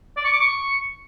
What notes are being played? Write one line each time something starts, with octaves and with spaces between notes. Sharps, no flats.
D5
C#6
D6
C#6